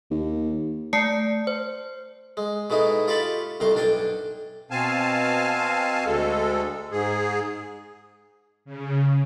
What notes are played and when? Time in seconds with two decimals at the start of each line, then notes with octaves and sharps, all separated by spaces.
0.11 D#2
0.93 A3 D5 A5 C7 C#7
1.47 C5
2.37 G#3
2.70 B2 G#3 A3 D#4 E4
3.08 F4 G4 A4 A5 B5 C#6
3.60 C2 F2 A3 A#4 C6
3.75 B1 D4 A4 G5 G#5
4.71 B2 C4 F5 G#5 A5
6.06 D2 G#3 A4
6.92 G#2 G#4
8.65 C#3